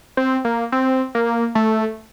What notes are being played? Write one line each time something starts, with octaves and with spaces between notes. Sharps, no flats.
C4
A#3
C4
A#3
A3